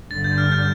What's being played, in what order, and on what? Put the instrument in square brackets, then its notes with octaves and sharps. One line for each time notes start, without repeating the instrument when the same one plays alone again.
[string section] G1 G2 D3 [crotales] A6
[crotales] G6
F6
G6